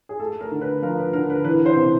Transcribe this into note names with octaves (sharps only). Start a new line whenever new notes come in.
G#4
A3 A4
A#4
D3
B4
F3 A#4
B4
D3 A#4
B4
E3 B4
C5
C3